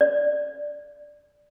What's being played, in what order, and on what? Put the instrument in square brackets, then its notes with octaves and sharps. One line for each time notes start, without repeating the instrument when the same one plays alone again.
[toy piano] D5